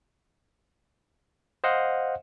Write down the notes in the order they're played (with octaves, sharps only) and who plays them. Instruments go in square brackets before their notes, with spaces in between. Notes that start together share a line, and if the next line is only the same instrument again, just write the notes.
[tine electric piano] C5 D#5 F5 F#5